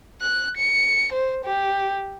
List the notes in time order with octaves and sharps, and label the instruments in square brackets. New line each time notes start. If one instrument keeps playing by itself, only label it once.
[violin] F#6
C#7
C5
G4